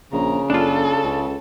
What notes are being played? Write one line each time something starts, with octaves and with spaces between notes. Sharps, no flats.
A#1 C#3 A#5
F#1 D4 F4 A4
C#2